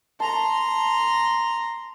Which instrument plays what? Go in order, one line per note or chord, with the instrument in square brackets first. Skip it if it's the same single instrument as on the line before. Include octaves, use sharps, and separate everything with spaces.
[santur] A5 C#6 [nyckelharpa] A#5 C6